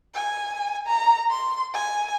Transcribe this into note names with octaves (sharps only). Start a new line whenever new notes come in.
G#5
A#5
C6
G#5